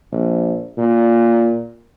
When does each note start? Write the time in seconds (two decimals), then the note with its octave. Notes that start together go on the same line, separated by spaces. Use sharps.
0.12 A#1
0.77 A#2